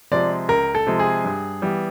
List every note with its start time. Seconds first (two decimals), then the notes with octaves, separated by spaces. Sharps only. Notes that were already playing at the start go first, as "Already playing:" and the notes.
0.12 C3 F3 G#3 D5
0.48 C#2 A#4
0.75 A4
0.87 C3 F3 G#3
0.99 G#4
1.25 G2
1.62 E3 G3 B3